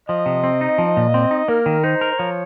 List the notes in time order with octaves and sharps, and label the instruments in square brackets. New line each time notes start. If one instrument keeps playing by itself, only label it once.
[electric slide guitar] F3 [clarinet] D#5
[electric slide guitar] C3
C4
D#4
F3
A#2
C4
D#4
[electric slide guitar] A#3 [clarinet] A#4
[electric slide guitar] D#3
[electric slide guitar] D#4 [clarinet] C5
[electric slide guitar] A#4
[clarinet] C5
[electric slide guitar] F3 [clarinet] C#5